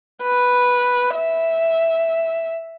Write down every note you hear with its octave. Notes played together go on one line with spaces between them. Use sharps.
B4
E5